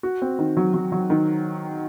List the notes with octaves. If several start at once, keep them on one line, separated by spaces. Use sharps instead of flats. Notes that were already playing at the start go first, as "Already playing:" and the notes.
F#4
C4
D#3
F#3
F#3
F#3
D#3